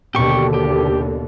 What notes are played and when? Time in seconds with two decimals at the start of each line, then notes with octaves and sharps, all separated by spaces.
0.15 D#2 B2 D3 G4 C#6
0.54 G4